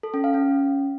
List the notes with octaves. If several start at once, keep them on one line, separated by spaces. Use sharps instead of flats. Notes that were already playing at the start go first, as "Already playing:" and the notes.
A4
C#4
F5
C#4